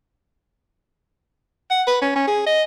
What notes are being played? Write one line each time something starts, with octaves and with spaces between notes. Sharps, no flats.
F#5
B4
C#4
C#4
G#4
D#5